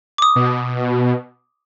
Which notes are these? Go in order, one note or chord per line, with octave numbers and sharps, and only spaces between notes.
D6 D#6
B2